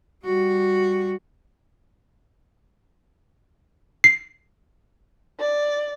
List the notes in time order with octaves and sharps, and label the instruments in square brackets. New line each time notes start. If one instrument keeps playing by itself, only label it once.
[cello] G3 F#4
[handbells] C7
[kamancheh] D5